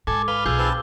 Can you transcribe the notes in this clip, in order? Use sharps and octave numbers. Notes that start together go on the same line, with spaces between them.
G#2 A4 G#5 D6
B4 F5 B5 G7
B1 F4 G#4 E6 G6
C4 B4 A5